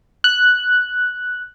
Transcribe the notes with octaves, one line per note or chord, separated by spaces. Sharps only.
F#6